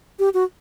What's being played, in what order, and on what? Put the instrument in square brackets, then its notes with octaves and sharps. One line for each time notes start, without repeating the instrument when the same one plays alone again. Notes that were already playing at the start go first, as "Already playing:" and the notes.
[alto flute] G4
F#4